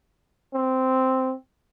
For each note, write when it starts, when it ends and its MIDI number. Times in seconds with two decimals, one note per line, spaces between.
0.54 1.34 60